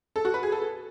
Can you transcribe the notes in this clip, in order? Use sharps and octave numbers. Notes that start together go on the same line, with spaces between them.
A4
F#4
B4
G#4
A4